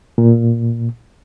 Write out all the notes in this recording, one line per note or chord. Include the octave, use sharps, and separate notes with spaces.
A#2